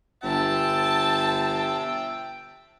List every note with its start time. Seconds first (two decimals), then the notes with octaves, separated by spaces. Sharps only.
0.23 G1 E5 G5 A5